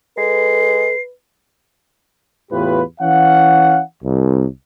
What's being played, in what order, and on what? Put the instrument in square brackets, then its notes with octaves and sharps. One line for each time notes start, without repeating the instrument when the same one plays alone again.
[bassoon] G#3 [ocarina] A4 [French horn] B4 [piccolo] C7
[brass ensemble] E2 A2 F4 G4 B4
E3 C#4 F5 F#5
C2